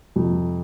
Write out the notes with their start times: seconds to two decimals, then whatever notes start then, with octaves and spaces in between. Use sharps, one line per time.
0.16 F2 C3 G3